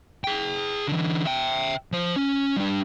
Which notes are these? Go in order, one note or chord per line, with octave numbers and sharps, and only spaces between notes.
G#4 G5
D3 E3
E5 G5
F3 C5
C#4
G3 D4